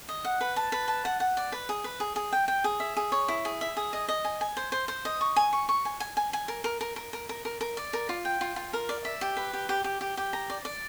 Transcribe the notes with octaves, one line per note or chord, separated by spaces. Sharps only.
D#5
F#5
B4
A5
B4
A5
F#5
F#5
D5
B4
G#4
B4
G#4
G#4
G5
G5
G#4
E5
G#4
C#5
E4
G#4
E5
G#4
D#5
D#5
G#5
G#5
C5
C5
C5
D#5
C#6
G#5
C#6
C#6
G#5
G#5
G#5
G#5
A#4
A#4
A#4
A#4
A#4
A#4
A#4
A#4
D5
A#4
F4
G5
F4
F4
A#4
D5
E5
G4
B4
G4
G4
G4
G4
G4
A#5
D5
D5